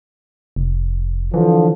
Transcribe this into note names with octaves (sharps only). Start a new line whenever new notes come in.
F1
D3 E3 F3